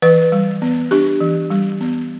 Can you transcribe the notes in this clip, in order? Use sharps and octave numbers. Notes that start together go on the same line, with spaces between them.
E3 B4
G3
B3
D4 G4
E3
G3
B3